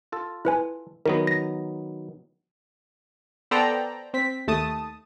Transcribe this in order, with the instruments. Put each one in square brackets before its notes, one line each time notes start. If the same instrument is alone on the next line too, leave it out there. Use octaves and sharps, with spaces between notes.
[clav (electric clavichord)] F4 A4
[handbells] E4 B4 G#5
[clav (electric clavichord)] D#3 F#3 B3 [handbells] A#4
[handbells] A#6
[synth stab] B3 A4 C5 D5 G5 A#5
C4 B6
D#2 A3 A5 D#6